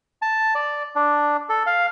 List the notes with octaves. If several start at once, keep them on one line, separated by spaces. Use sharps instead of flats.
A5
D5
D4
A4
F5